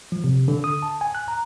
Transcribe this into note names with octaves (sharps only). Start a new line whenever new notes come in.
F3
C3
D3
D#6
A5
G#5
F#6
A#5